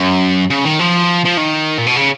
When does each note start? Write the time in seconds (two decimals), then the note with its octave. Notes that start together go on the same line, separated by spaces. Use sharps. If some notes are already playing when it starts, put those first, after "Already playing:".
Already playing: F#2
0.50 C#3
0.65 D#3
0.80 F3
1.25 F3
1.38 D#3
1.78 A#2
1.87 B2
1.96 C#3